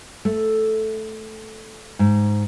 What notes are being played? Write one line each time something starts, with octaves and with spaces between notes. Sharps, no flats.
A3
G#2